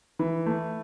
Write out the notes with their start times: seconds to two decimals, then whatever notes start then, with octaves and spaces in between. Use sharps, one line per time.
0.19 E3
0.46 A3